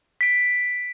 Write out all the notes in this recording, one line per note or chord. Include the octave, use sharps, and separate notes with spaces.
B6 D7